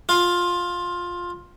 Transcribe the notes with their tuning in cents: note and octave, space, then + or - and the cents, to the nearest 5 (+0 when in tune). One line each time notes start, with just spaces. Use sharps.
F4 +10